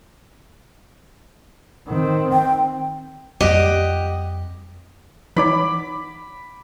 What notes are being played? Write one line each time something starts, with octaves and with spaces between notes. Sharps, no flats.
D#3 C4
G5
F2 G3 G4 D#5 F#5
E3 D#4 C#5 B5 D6